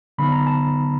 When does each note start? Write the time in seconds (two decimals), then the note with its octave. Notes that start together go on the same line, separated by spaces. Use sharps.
0.18 D3 F#3 B3 D#4 B5
0.32 A#5
0.46 A5